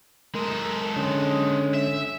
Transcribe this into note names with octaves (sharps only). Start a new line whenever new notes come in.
G#3 A4 A#4
D3 C#4
E5